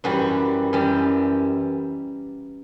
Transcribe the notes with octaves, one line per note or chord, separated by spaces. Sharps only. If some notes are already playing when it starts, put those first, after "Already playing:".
F#2 E3 G3 F#4
F#2 E3 G3